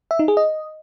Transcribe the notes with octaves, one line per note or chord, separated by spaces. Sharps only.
E5
D#4
G#4
D#5